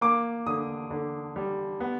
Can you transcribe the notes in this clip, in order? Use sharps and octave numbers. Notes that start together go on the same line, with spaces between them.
A#3 D6
D3 D#6
D3
G3
B3